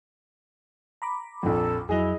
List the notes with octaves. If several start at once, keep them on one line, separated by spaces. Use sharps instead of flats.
A#5 B5 D6
A#1 F2 A4
F2 F#3 E4 G#4 D#5